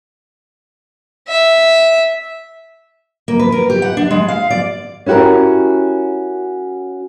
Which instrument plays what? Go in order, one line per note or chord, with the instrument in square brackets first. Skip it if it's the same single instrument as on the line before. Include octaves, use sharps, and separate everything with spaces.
[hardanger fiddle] E5
[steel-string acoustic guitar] A#3
B4
A#4
G4
F#5
D4
G#3
F5
D5
[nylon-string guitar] C#4 E4 F#4 G4 A#4